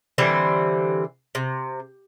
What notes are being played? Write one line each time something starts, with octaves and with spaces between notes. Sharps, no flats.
D3 E3 G3 C4
C3